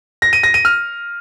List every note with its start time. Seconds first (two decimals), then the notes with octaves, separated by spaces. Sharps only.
0.22 A#6
0.33 D#7
0.43 A#6
0.54 D#7
0.65 F6